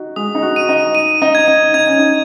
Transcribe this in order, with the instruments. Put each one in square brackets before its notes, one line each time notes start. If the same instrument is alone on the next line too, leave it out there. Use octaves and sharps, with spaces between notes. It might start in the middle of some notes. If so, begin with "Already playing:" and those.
Already playing: [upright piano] D#4 F#4
[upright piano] G#3 [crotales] D#6
[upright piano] D#4
F#4
[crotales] D#7
[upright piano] D#4
[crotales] D#7
[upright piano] D#4
[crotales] G#6
[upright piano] D#4
[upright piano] D#4 [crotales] G#6
[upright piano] C#4
D#4